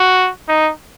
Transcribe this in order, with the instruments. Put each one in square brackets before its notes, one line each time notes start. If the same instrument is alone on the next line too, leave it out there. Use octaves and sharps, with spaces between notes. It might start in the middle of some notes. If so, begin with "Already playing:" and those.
Already playing: [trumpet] F#4
D#4